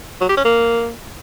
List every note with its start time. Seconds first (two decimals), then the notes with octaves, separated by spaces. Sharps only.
0.21 F#3
0.29 G4
0.37 C#4
0.45 A#3